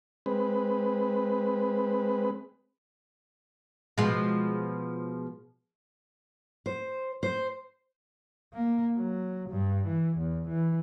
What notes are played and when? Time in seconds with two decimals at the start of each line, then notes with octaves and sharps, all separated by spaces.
0.26 G#3 C4 B4
3.98 B2 F3 G#3
6.66 C5
7.23 C5
8.53 A#3
8.98 F#3
9.50 G2
9.87 E3
10.17 E2
10.48 E3